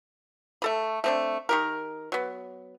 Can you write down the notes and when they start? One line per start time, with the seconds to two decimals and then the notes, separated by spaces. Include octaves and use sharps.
0.62 A3 A4 B5
1.04 A3 C4 D4
1.49 D#3 G4 A#4
2.12 F#3 B3